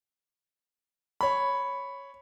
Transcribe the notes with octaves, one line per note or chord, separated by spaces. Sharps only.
C#5 B5